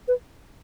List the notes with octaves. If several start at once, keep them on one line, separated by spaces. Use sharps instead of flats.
B4